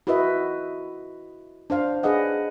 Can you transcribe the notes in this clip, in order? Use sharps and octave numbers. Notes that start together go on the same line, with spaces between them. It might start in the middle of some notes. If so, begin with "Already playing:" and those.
E4 F#4 A#4 B4 D#5 E5
D4 C5 F5
D4 G#4 B4 D#5 F#5